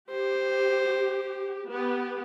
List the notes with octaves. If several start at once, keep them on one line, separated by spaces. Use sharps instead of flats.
G4 C5
B3 G4